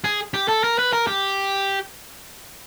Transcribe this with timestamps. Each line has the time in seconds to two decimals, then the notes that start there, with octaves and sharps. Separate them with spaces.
0.04 G#4
0.34 G4
0.48 A4
0.64 A#4
0.79 B4
0.93 A#4
1.07 G4